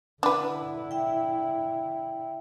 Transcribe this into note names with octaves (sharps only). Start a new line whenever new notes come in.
D3 D4 E4 B4 F#5
E5 G5